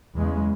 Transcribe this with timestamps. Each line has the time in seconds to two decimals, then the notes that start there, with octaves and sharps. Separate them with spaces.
0.16 E2 C#3 G#3